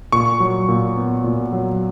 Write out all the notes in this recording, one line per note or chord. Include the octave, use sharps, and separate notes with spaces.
A#2 C#6
F#3
A#2
B3
A#2
F#3